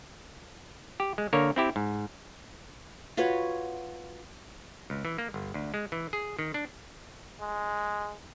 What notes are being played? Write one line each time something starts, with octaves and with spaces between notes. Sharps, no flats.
G4
G#3
D3 A#3 A#4 C#5
C4 E4 G4
G#2
F4 F#4 B4 C#5
C#2
E3
A#3
G1
D2
G#3
E3
G#4
D#3
D4
G#3